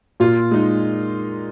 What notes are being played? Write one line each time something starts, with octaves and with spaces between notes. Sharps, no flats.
A#2 F4
G#3 D#4